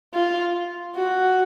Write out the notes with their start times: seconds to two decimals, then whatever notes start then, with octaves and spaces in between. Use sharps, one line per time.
0.14 F4
0.95 F#4